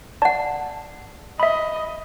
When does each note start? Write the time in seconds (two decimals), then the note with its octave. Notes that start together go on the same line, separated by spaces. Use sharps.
0.22 D5 F#5 A5
1.40 D#5 E5 B5